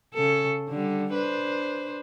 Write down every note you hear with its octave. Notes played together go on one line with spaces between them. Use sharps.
C#3 A4
D3 G3
D4 B4 C5